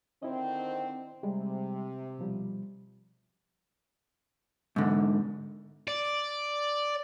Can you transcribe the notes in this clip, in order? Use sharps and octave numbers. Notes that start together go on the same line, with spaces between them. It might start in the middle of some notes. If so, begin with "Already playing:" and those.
D3 D#3 C4 E4 D#5
C3 G3 G#3
B2 F3 G3
G#2 D3
D5